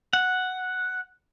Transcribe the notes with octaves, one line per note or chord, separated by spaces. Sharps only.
F#5